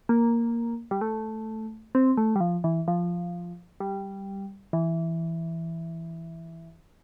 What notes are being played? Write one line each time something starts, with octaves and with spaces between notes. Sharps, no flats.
A#3
G3
A3
C4
A3
G3
F3
E3
F3
G3
E3